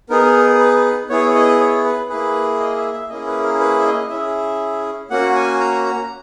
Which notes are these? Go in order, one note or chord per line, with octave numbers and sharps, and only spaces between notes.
B3 D#4 G#4 A#4
B4
B3 E4 G#4 C#5
C#5
D#5
C#5
B4
A#3 E4 G#4 B4
D#5
E5
E5
A#3 C#4 E4 G#4 D#5
B4
A#4
B4
E5
D#5
C#4 E4 G#4 E5
A#3 C#4 F#4 F#5
G#5
A#5
A#5